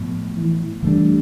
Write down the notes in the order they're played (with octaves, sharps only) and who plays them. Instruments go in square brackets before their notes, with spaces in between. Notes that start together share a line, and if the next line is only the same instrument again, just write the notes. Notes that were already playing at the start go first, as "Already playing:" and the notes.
Already playing: [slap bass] A2 F3 B3
[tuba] E3
[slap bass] E3 A3 D4 [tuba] G3